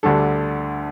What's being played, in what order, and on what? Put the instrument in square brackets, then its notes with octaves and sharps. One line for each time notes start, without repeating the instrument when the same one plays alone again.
[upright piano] D2 D3 G3 D4 A4